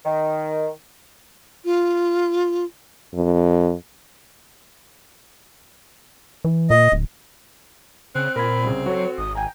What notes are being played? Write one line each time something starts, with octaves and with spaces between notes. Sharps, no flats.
D#3
F4
F2
E3
A#2 D#5
D1
C#3 C4 F#6
A#2 A#4 B5 G#6
C2 C#3
F#3 F#4 A4 C#5
G#1 D#6
G5 G#5 A#5